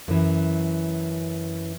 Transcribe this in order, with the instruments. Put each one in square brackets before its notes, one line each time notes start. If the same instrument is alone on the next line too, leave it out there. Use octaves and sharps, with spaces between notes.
[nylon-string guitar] F#2 E3